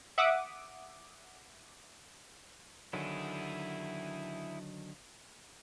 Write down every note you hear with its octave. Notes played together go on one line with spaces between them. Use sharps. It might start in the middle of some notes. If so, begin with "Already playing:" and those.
E5 F#5 D6 D#6
D3 D#3 F#3 E4 G#4